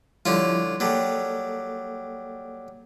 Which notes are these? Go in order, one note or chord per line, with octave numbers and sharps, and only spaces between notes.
D3 F3 G3 C#4 E4 F4
F#3 G3 A#3 A4